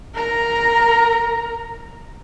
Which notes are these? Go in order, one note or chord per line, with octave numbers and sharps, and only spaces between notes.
A#4 A#5